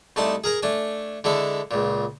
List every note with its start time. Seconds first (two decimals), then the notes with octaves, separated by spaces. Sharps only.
0.16 C2 A3 D#4 D5 A5 C6
0.44 G#4 A#4 G#5 A#5
0.62 A3 D4 G#5
1.24 D3 G#3 E4 A4
1.71 C#2 A#2